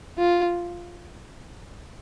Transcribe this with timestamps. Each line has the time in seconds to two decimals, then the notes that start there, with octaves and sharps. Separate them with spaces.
0.18 F4